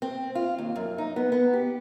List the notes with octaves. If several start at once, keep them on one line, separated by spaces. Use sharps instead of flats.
C4
F4
D#2
F#2
D#4
B3
B3
G4